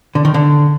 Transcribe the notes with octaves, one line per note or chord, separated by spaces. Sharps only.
D3
D#3
D3